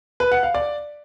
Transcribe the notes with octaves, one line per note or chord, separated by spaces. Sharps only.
B4
F#5
F5
D5